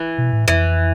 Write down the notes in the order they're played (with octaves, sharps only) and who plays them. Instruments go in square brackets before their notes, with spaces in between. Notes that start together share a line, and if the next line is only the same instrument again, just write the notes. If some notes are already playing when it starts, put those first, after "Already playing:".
Already playing: [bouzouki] E3
[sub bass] B2
A2
[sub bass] F2 [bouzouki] E3